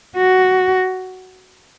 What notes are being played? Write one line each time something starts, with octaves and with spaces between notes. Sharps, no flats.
F#4